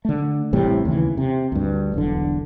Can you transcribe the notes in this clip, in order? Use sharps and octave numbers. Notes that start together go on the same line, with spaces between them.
D3 A3
A1 A2 C3 G3
D#2 C#3 E3
C3
D2 G2
E1 B1 D3